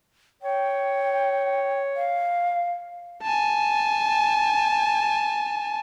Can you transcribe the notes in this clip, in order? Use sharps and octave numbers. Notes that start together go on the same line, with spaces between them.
C#5 G5
F5
G#5 A5